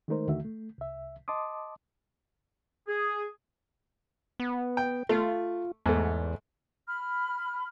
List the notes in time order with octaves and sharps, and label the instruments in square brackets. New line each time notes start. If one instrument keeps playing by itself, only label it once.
[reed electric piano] D#3 G#3 A3 D#4 A#4 C5
D#2 D3 D#3 A3 F#4 E5
A3
C2 E5
D#5 A5 C6 D6 D#6
[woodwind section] G#4
[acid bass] B3
[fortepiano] G5
[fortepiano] A3 [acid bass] F4
[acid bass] E2 [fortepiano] G#2 A3
[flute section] B5 F6